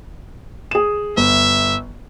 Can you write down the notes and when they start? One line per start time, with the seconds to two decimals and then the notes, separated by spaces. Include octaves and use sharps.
0.71 G#4 E7
1.17 G1 E5